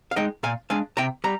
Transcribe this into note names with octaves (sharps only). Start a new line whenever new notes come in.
F5
G#3 D#4 D#5 G5
A#2 F5 G#5
G#3 D4 F5 G#5
C3 G5 A#5
G3 A#5